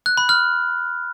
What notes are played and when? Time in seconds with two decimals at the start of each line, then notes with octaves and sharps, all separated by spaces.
0.06 F#6
0.17 B5
0.29 F6